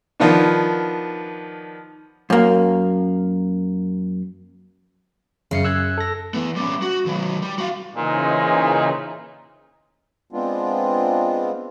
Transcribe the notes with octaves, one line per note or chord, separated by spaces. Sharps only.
D#3 F3 B3 D4
F#2 A#3
F#2 C#3 C#4 C7 C#7
E6 F#6 G#6
A4 A#6
E3 B3
G3 C#4
F#4
D#3 F#3
G3
F#4 F5
A#2 C#3 E3 D#4 G#4 C5 D#5
G#3 B3 C4 D4 F4